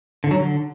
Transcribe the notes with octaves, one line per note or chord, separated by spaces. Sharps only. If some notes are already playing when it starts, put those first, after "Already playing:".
D3
F#3
D3